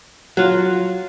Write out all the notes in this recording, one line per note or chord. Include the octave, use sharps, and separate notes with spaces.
F#3 F4 F#4